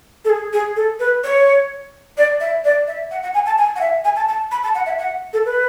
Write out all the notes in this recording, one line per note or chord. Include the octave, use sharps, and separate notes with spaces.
A4
G#4
G#4
A4
B4
C#5
D5
E5
D5
E5
F#5
F#5
G#5
A5
G#5
F#5
E5
G#5
A5
A5
B5
A5
F#5
E5
F#5
A4
B4